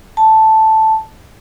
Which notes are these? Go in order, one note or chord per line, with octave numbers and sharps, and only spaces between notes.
A5